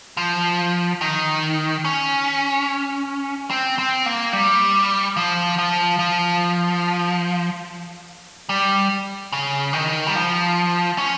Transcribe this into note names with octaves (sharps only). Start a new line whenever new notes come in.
F3
D#3
C#4
C4
C4
A#3
G3
F3
F3
F3
G3
C#3
D#3
G3
F3
C#4